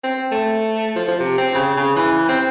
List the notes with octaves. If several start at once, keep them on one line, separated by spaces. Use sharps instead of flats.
C4
A3
F3
F3
C3
C4
C#3
C#3
E3
C4